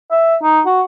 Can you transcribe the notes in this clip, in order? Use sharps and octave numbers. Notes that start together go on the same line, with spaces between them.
E5
D#4
F#4